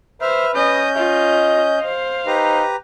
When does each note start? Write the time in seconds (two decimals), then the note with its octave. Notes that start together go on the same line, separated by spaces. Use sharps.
0.21 B4 C5 E5 F6
0.55 C#4 D#5 G6
0.96 F4 D#5
1.81 C5 F5
2.27 D#4 G4 B4 A#5